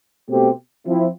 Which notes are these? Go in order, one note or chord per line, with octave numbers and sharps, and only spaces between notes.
B2 A3 C4 G4
F3 C4 E4